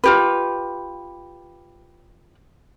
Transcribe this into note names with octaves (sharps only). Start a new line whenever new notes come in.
F4 G4 B4